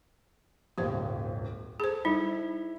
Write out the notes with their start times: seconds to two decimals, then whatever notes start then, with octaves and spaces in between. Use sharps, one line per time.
0.78 D#1 G#1 C#2 G4 C5
1.80 G#4 A4 C5
2.05 G3 D#4 E4